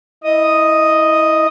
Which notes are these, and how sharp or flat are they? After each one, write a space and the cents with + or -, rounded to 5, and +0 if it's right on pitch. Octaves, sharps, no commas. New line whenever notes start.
E4 -20 D#5 +0 D#6 +0